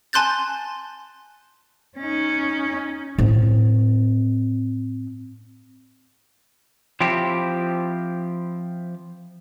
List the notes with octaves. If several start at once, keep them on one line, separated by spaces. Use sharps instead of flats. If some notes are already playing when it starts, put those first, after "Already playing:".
G#5 A5 C6 F#6 G6 A6
C#4 D#4
A2 C4
F3 C4 E4 G4